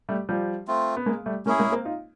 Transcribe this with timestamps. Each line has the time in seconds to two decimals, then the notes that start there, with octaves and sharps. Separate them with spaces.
0.09 G3 A3
0.29 F3 G3
0.68 A3 C4 F4
0.97 B3
1.06 G#3 A#3
1.26 G3 A3
1.46 G#3 A#3 C#4 E4 G#4
1.59 G#3 A#3
1.72 A#3 C4
1.85 D#4 F4